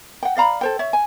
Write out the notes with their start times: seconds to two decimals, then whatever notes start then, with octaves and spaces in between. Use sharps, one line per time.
0.23 F#5 G5
0.36 D5 F5 A#5 B5
0.61 A4 C5 G5
0.79 C#5 E5
0.93 G#5